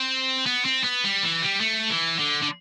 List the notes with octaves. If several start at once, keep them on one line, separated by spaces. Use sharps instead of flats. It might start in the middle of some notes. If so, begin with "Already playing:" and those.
Already playing: C4
B3
C4
B3
G3
E3
G3
A3
E3
D3
D3